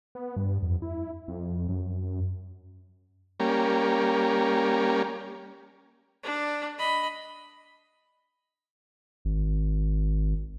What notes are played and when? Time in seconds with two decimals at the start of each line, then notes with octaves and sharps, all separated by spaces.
0.15 B3
0.36 G2
0.63 F2
0.82 E4
1.28 F2
1.69 F#2
3.40 G3 A#3 C#4
6.23 D4
6.78 D#5 B5
9.25 G#1